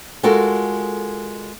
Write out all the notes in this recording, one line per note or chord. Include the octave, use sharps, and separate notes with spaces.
G#3 F4 F#4 A4 A#4